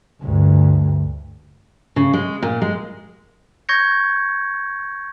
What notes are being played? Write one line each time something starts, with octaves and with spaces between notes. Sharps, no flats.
D2 G2
C#3
G#3
A#2
G#3
C#6 G6 G#6 A#6 C#7